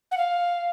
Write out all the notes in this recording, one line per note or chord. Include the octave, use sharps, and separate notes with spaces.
F#5
F5